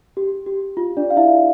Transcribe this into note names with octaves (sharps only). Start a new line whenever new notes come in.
G4
G4
F4
D4 D5
F5
E4 E5